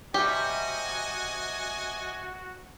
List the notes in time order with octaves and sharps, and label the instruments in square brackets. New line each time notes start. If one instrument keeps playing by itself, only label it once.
[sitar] C3 G3 [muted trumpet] F#4 [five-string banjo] G4 [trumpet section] D#5 G#5